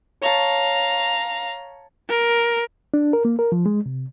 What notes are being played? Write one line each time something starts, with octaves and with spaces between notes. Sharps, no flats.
C#5 F5 A5 A#5
A#4
D4
A#4
A#3
A#4
F3
G#3
C3